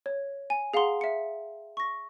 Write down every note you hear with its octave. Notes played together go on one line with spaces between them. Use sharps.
C#5
G#5
G#4 F5 F#5 A#5 C6
E5 C#7
C#6 A#6